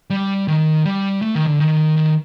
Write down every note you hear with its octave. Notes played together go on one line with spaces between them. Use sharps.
G3
D#3
G3
A3
D#3
D3
D#3
D#3